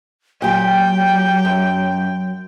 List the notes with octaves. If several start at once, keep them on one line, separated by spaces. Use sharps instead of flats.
A#2 F#3 G4 G5
F#2